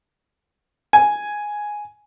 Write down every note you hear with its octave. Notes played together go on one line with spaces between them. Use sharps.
G#5